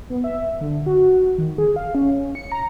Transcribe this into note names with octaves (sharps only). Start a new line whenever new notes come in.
B3
E5
D3
F#4
D#3
G#4
F5
C#4
C#7
A#5